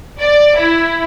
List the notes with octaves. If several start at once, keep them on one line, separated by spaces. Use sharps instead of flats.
D5
E4